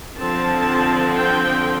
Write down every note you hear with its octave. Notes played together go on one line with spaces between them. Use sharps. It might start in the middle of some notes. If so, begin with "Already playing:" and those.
D3 F3 C4 A5
G5